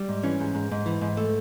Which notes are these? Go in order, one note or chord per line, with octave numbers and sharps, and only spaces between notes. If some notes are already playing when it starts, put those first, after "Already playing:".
Already playing: G3
G#2
E3 C#4
G#2
G#2
G#2
E3
G#2
A3